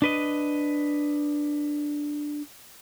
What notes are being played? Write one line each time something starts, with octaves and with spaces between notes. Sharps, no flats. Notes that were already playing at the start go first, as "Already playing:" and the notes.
D4 B4 D#5